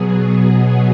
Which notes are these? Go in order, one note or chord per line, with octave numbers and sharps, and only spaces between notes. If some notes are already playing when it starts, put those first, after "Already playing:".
Already playing: B2 F#3 B3 G#4
G#4